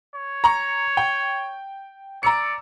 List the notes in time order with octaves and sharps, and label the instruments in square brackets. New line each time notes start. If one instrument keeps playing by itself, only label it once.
[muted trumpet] C#5
[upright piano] A#5 C#6
G5
[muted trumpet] D5 [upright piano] A#5 E6 C#7